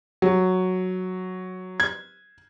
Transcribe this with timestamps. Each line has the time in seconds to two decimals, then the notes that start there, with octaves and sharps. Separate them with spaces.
0.22 F#3
1.80 G#6